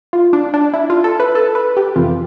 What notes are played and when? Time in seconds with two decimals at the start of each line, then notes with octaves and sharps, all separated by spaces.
0.13 F4
0.33 D4
0.54 D4
0.73 E4
0.90 F4
1.04 A4
1.20 B4
1.35 A4
1.55 B4
1.77 G4
1.96 F2 C3 E3 F4